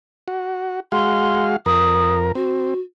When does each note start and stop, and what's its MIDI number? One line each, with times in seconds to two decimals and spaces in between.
0.28 0.80 66
0.92 1.56 56
0.92 1.56 66
0.92 1.56 77
0.92 1.44 84
1.66 2.32 41
1.66 2.32 70
1.66 2.15 87
2.35 2.74 60
2.35 2.80 66